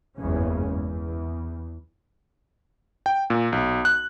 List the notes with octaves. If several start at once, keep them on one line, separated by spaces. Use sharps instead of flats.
F#1 E2 G2 C#3 G#3 C#4
E2
G5
A#2
B1
F#6